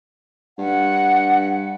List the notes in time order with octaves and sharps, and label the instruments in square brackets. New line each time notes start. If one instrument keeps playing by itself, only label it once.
[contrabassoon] G2 [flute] F#5